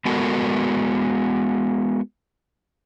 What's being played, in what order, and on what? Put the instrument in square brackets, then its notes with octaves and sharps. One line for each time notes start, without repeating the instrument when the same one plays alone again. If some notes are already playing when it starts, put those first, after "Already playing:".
[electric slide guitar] G#3 B3 F#4 A4 A#4